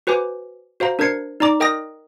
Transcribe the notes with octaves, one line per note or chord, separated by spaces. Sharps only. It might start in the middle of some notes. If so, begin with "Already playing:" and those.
F#4 B4 C5 G#5 D6
F#4 C5 F5 A#5
D4 A#4 C5 G#6 C7 C#7
D#4 D5 A#5 D6
A#4 D#5 G5 A#5 D#6 A#6